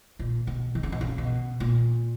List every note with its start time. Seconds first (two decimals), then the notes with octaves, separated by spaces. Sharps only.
0.19 A#2
0.47 B2
0.75 D#3
0.83 C#3
0.92 B2
1.01 C#3
1.18 B2
1.60 A#2